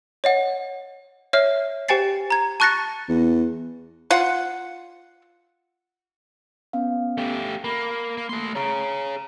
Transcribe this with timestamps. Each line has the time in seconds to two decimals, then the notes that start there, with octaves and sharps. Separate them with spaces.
0.24 C#5 D#5 F#5
1.33 C#5 E5 F6 C7
1.88 G4 C5 G5 G#5 A6 C7
2.30 A#5 G#6
2.60 A5 C#6 F#6 A6 A#6 C#7
3.09 E2
4.11 F4 F#5
6.73 B3 C#4 F5
7.18 A3 G4
7.64 A#3 B5
8.17 A#3
8.29 A3 C6
8.55 G#4 C#5 A#5 D7